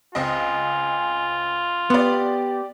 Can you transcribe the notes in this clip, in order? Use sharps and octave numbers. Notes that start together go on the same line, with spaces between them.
C#2 C4 F4 D#5 G#5
B3 G4 D5 C6